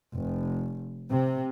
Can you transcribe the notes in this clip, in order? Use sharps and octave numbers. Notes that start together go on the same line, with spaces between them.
F1
C3